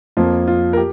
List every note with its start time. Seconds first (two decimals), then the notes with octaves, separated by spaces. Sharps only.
0.17 F2 F3 A#3 F4
0.47 F4
0.73 A#4
0.77 G4